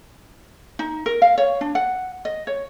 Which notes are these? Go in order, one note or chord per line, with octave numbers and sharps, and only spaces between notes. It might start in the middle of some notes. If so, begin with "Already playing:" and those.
D#4
A#4
F5
C#5
D4
F#5
D#5
C#5